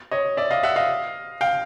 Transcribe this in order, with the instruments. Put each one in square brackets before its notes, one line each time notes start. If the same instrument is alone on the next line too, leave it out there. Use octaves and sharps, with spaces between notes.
[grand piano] C#5 D#5
D5 E5
D#5 F5
E5 F#5
D#5 F5
F5 G5